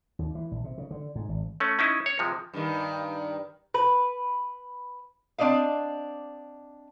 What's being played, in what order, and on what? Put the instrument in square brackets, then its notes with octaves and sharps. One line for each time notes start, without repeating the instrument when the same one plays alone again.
[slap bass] D#2
E3
A#1
C3
C#3
D3
G#2
G#1
[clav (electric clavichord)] A3 C#4
C#4 D#4 E4
C#5
C3 F3 G#3
[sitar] G2 D#3
[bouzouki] B4
[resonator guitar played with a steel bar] C4 D4 D5 D#5 F5